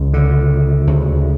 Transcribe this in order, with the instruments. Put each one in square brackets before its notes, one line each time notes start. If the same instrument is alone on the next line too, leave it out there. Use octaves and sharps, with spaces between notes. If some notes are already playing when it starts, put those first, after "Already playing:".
Already playing: [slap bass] C#2 C#3
D3
D2 C#3